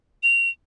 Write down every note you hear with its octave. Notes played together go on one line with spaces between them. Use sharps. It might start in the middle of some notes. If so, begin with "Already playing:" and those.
F7